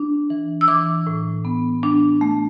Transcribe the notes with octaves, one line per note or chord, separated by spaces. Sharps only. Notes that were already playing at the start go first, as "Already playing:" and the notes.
Already playing: D4
E3
E6
E3 D6
A2
B3
D4
A3